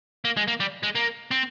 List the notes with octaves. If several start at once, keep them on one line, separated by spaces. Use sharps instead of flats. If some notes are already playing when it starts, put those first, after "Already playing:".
A#3
G#3
A#3
G3
G#3
A#3
C4